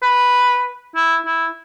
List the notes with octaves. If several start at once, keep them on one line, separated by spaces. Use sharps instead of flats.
B4
E4
E4